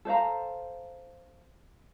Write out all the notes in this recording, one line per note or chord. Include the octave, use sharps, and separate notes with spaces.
A4 C5 F5 A#5